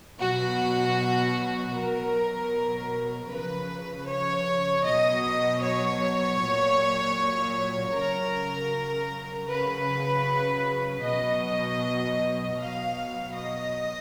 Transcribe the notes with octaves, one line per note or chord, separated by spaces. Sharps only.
B2 F#3 F#4
B2 F#3 A#4
C#3 F3 B4
C#5
B2 F#3 D#5
C#5
A#2 F#3
C#3 F#3 A#4
C#3 F#3 B4
B2 F#3 D#5
B2 F#3 F5
D#5